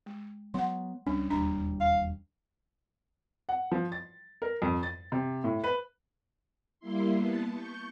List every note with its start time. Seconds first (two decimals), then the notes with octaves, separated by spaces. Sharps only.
0.06 G#3
0.54 F#3 B3 F#5 C6
1.07 C#2 G3 C#4 D4
1.30 E1 D#2 G3 D4 A#5
1.80 F5
3.49 F#5
3.72 F3
3.92 A6
4.42 A#4
4.62 F2
4.83 A6
5.12 C3
5.44 A2
5.64 B4
6.80 G3 A#3 E4 C6
7.15 B3 A5
7.52 C#6 G6